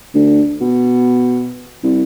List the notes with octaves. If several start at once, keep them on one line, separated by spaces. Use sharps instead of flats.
D2
B2
C2